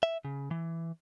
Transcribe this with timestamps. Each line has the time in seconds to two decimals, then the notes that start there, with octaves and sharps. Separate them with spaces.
0.03 E5
0.25 C#3
0.51 E3